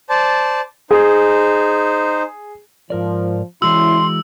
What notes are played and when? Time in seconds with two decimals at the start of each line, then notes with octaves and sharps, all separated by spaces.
0.10 C5 D5 A5
0.91 D#4 G#4 C5
2.90 G#2 F3 A#4 D5
3.62 E2 C#3 E3 G#3 E4 F#4 C6 E6